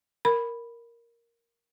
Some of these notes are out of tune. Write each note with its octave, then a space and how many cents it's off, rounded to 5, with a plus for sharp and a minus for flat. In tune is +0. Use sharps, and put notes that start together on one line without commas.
A#4 +0 B5 +0